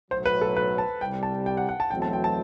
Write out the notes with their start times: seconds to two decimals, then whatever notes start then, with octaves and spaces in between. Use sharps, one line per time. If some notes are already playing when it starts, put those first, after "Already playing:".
0.11 B1 A2 F#3 C5
0.26 B4
0.41 A4
0.57 B4
0.78 A5
1.01 C2 C3 G3 G5
1.23 A5
1.46 G5
1.57 F#5
1.69 F#5
1.80 A5
1.90 E2 B2 F#3 A3 C4 G5
2.02 A5
2.13 G5
2.24 A5